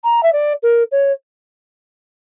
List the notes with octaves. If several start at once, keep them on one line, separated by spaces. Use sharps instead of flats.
A#5
E5
D5
A#4
C#5